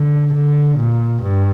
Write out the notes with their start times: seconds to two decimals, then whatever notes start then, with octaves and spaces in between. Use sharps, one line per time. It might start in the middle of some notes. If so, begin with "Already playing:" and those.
Already playing: D3
0.34 D3
0.78 A#2
1.23 G2